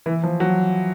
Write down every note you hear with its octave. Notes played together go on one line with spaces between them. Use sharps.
E3
F3
F#3